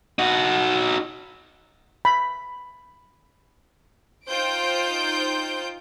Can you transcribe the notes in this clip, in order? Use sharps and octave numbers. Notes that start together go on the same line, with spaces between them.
D#4 F#4
B5
D#4 F4 C5 G5 G6 D7